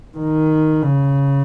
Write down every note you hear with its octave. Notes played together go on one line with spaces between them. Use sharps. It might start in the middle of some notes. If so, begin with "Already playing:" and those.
D#3
C#3